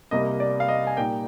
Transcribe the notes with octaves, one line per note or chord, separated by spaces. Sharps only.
C2 C3 G3 A#3 D#5
D5
F5
D#5
G#5
A#2 G3 A#3 D#4 G5